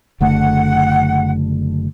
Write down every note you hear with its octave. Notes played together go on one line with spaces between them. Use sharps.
F#1 D3 A3 F#5